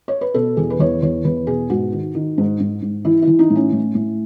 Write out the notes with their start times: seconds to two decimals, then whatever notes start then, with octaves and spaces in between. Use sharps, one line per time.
0.08 C#5
0.21 B4
0.34 B2 A4
0.57 E2 G#4
0.70 B4
0.79 E2 C#5
1.02 E2 C#5
1.24 E2 B4
1.47 B2 G#4
1.70 G#2 F#4
1.92 D#3
2.15 D#3
2.38 G#2
2.60 G#2
2.82 G#2
3.05 E3 E4
3.22 E3 E4
3.39 D#4
3.50 A2
3.55 C#4
3.72 A2
3.95 A2